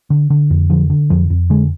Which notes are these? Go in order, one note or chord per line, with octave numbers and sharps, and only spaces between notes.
D3
D3
F2
D3 F3
D3
F2 F3
F2
D3 G#3